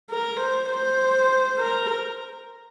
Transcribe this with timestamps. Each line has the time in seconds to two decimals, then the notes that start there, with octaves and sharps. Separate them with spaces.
0.10 A#4
0.40 C5
0.70 C5
1.60 A#4